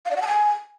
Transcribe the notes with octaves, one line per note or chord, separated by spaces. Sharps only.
F5
D5
F#5
A5
G#5